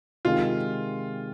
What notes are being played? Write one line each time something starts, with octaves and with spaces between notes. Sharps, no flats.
C3 D#3 G#3 F4